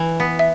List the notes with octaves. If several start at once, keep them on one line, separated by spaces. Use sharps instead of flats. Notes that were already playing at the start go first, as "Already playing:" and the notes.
Already playing: E3
B3
E5